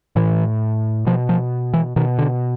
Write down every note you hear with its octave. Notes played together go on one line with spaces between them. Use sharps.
A2 E3
B2 F3
F3
E3
B2 D#3
D3